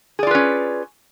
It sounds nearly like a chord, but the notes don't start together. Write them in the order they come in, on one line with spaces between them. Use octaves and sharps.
G#4 D5 F4 B4 C#4